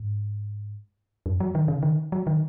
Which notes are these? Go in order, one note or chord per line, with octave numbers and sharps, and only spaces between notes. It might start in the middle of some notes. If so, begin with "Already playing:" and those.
Already playing: G#2
F#2
F#3
D#3
C#3
D#3
F#3
D#3